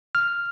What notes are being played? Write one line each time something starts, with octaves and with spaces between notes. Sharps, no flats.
F6